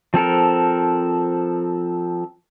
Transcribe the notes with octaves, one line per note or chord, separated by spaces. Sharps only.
F3 C4 A4 A#4